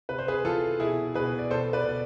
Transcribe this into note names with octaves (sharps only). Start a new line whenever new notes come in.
C3 B4
C5
G#4 B4
E3 F4 A4
B2 E4 G#4
B2 G#4 B4
D5
B2 A4 C5
B4 D5
B2 D5